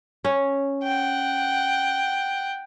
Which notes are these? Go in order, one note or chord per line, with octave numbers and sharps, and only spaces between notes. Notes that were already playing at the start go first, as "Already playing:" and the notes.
C#4
F#5 G5